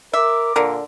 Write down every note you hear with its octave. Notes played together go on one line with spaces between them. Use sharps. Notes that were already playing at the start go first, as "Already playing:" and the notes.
A#4 E5 D6
A#2 D3 A#4